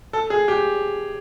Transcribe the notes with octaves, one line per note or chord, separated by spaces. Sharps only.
A4
G#4
G4